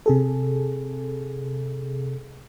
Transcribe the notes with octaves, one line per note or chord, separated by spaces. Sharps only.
C3 G#4 A4